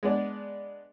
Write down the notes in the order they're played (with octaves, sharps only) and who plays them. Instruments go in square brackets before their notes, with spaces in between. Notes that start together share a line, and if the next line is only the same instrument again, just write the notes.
[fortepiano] G#3 B3 D4